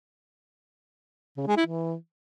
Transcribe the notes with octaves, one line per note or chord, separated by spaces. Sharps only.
C#3
G#3
E4
E3